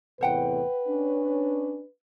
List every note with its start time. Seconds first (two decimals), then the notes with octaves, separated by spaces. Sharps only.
0.21 E2 A2 C3 B4 C5 F#5 G5
0.88 C#4 D4